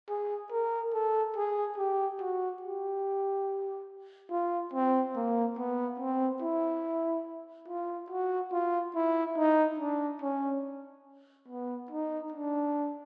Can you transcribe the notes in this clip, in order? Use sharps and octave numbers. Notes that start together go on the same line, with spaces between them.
G#4
A#4
A4
G#4
G4
F#4
G4
F4
C4
A#3
B3
C4
E4
F4
F#4
F4
E4
D#4
D4
C#4
B3
D#4
D4